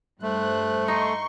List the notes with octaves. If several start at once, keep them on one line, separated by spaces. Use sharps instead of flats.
G2 A3 C5 F#6
D#4 C6 C#6